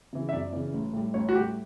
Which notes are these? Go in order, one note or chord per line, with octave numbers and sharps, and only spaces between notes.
C#3 E3
E5
F#2 D5
C#3 E3
A1
A2 G3
A1 C#5
F#4
A2 G3 G4